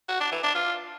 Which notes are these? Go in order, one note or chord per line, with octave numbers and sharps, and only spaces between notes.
F#4
D4
E3
D4
F4